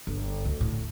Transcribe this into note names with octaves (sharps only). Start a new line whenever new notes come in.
G1
D2
A2